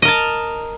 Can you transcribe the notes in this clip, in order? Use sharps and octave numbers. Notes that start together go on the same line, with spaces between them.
A#4 D#5 A5